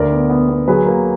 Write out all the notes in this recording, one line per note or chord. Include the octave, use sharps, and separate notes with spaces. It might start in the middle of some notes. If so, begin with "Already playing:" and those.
Already playing: D2 A#4 D5
B3
B3
B3
F#3 G#4 B4
A#3